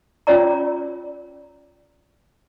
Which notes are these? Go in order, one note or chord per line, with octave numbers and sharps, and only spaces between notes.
C#4 F4 C#5 D5 A#5